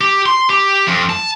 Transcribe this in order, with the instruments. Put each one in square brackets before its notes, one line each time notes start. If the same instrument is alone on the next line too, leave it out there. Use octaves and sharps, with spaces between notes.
[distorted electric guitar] G4
C6
G4
F2
A5